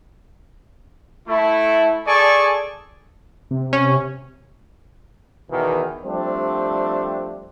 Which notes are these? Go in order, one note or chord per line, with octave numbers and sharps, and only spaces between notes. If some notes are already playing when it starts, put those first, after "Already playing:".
A3 E4
G#4 A4 D5 G#5 A5 C#6
C3
C#4
E2 B2 D#3 E3 D#4
F3 G3 A3 C4 D4